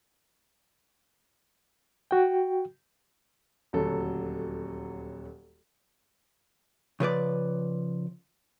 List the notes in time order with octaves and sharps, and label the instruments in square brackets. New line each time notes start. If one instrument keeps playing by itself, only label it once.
[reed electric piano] F#4 G5
[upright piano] D#1 D2 F#3 A4
[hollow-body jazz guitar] C#3 F3 B4 D5